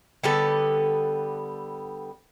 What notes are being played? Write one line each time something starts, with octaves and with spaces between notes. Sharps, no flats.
D3 G3 B3 A4